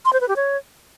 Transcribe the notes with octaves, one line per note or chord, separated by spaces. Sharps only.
C6
C5
B4
G4
C#5